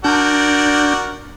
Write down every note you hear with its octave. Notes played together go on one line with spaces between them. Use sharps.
D4 F#4 A#4 D5 G6